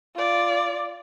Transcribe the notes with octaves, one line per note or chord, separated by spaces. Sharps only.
F4 D5